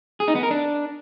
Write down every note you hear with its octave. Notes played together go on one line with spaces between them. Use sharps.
G#4
D#4
B3
A#4
D4